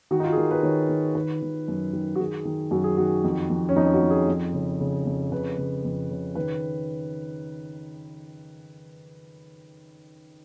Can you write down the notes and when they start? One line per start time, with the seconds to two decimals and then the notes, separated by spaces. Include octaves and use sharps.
0.11 D#3 F#4
0.20 D#4
0.24 F4
0.32 G#4
0.37 D#3 A#4
0.51 B4
0.63 D#3 C#5
0.89 D#3
1.15 D#3 B4
1.42 D#3
1.68 F#2
1.93 D#3
2.15 F#4
2.20 D#3 G#4
2.45 D#3
2.71 F#2 F#4
2.84 G#4
2.97 D#3 F#4
3.24 F2
3.50 F2
3.69 C#4
3.76 F2 D#4
3.94 F#4
4.02 F2
4.10 G#4
4.28 F2
4.54 C#3
4.80 C#3
5.06 F2
5.32 C#3 B4
5.58 C#3
5.85 F2
6.10 C#3
6.35 D#3 B4